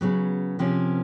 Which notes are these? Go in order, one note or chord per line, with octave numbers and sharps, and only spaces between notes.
C#3 F#3 B3
C3 F3 A#3 C#4